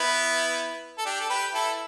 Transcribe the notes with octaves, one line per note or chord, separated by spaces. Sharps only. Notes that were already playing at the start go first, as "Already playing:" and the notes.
Already playing: B3 E4
A4
D4 G4
A4
G4 B4
E4 A4